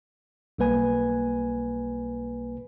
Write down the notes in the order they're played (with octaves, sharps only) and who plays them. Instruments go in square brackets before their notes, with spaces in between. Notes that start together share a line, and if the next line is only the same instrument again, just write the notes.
[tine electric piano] B1 G3 A#3 B4 G#5